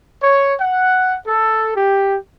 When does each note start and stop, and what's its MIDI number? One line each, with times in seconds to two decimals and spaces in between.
0.22 0.54 73
0.59 1.14 78
1.27 1.72 69
1.75 2.15 67